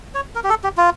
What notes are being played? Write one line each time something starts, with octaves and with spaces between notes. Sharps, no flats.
C#5
A#4
G4
A4
G4
F4